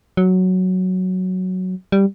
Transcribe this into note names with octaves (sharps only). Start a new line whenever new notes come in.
F#3
G3